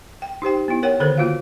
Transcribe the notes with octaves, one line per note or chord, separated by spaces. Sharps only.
G5
D#4 G4 C5 G5
B3 E4
A#4 C#5 F#5 G5
D3 D#3 A4 A#4 C5
A#3 F4 F#4 F5